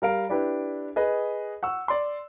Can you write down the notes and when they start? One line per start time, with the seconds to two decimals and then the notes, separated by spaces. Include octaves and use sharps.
0.02 G3 A#4 F5 D7
0.30 D4 E4 G4 B4
0.96 G#4 B4 D#5
1.63 F#5 C#6 E6
1.88 D5 C6